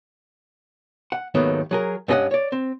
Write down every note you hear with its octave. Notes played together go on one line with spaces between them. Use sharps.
F#5
D#2 G#2 D#3 F#3 A3 B3
F#3 G#4 A#4
G2 B3 C#4 G#4 D#5 F#5
C#5 D5
C4